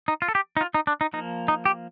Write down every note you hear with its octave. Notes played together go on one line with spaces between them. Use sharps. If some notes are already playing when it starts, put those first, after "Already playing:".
D#4
F4
A4
G4
D#4
F4
D#4
D4
D#4
F3 A#3 D#4
D#4
G4